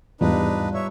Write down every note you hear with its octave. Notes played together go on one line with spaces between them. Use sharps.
E2 G#2 G3 D4 D#4 F4 B4
C#5 E5